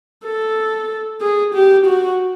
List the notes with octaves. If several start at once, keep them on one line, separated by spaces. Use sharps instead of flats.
A4
G#4
G4
F#4